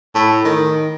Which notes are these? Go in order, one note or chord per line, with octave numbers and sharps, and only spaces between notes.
A2
D#3